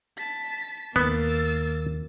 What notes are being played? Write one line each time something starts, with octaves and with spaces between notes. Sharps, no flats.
A5 B6
D#2 A#3 B3 E6 A6